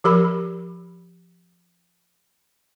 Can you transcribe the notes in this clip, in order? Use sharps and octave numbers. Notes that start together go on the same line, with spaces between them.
F3 G4 A#4 B5